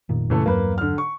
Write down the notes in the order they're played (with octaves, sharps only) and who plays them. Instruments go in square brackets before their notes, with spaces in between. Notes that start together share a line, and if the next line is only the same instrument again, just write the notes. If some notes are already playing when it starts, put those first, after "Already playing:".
[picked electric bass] F1 A#2 D#3
[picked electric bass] F#2 A#2 C#3 [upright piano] E3 A3 A4
[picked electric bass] E2 G2 F#3 [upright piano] A#3 B4
[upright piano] D3 F6
C#6